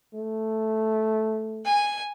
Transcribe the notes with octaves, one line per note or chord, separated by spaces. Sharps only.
A3
G#5